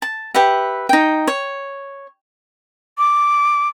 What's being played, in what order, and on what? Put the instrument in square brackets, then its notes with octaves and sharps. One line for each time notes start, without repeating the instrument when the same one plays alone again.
[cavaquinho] A5
G4 B4 E5 F#5
D#4 G5
C#5
[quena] D6